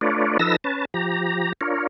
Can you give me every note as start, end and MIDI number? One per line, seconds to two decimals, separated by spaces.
0.01 0.38 57
0.01 0.38 62
0.01 0.38 65
0.01 0.38 71
0.01 0.38 73
0.01 0.38 74
0.39 0.56 53
0.39 0.56 63
0.39 0.56 69
0.39 0.56 71
0.39 0.56 88
0.39 0.56 94
0.64 0.85 61
0.64 0.85 71
0.64 0.85 81
0.94 1.53 53
0.94 1.53 67
0.94 1.53 82
1.61 1.87 62
1.61 1.87 65
1.61 1.87 70
1.61 1.87 73